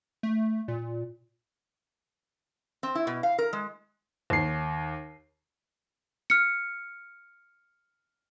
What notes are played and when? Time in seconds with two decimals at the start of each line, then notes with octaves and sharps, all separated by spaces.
0.23 A3
0.68 A#2
2.83 C4
2.95 E4
3.07 B2
3.23 F5
3.38 A#4
3.53 G#3
4.30 D#2 C7
6.30 F6 C#7